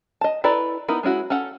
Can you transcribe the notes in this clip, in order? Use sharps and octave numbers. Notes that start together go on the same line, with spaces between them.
D#5 A5
E4 A4 B4 D5 A#5
B3 D#4 E4 A#4
G#3 C#4 E4 F#4
C#4 A4 F#5